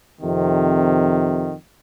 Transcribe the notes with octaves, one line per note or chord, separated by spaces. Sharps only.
F2 C3 D#3